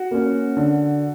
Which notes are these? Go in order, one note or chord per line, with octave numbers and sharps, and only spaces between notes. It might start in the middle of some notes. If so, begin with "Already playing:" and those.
Already playing: F#4
A#3 C#4
D3